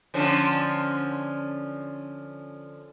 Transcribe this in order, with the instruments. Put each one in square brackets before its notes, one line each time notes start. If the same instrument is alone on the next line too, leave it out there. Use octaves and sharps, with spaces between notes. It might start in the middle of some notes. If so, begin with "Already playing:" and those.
[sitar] D3 F3 C#4